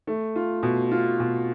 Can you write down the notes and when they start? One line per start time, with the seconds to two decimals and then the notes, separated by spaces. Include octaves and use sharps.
0.07 A3
0.36 F4
0.63 B2
0.91 F4
1.19 B2